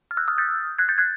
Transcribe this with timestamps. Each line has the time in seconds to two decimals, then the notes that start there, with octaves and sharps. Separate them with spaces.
0.11 F6
0.17 E6 F#6
0.28 D#6 F6
0.38 G6 A6
0.79 F#6 G#6
0.89 G6 A6
0.98 F#6 G#6